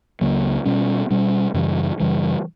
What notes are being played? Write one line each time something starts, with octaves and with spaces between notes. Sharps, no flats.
C#2 C#3 F#3 A#3
B2 G3 C#4
B2 G3 C#4
F#2 C#3 E3 G3
F#2 C#3 E3 G3